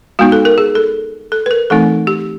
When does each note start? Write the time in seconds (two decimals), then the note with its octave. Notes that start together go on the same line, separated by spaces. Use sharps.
0.19 G#3 B3 D#4 F#4
0.32 A4
0.45 A#4
0.58 G#4
0.75 A4
1.32 A4
1.46 B4
1.51 A#4
1.70 E3 A3 C4 D#4 A4
2.07 G4